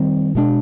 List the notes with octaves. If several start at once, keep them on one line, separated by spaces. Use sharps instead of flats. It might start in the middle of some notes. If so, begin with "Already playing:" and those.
Already playing: D#3 G3 C4
B2 G#3 B3 D4